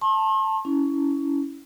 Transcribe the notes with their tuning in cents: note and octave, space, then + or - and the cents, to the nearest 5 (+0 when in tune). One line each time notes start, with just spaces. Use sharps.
A5 +0 C6 +45
C#4 +20 E4 -10